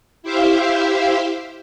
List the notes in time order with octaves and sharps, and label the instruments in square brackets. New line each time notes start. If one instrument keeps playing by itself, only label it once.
[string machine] E4 G4 C5 E5 F5